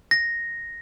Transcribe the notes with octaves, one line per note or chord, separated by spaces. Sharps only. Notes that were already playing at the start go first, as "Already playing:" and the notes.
A#6